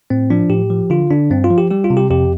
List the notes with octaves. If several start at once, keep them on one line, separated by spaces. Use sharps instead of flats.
A2 C4
F3 D4
A2 G4
F3
D3 F4
D3 D4
G2 C4
F4
F3
G4
G3 G4
F4
C3
G4
F2 G4